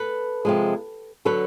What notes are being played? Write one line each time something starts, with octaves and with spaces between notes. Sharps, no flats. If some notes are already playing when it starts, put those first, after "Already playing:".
Already playing: A4 B4
C3 F3 G#3
D3 F#3 A4 B4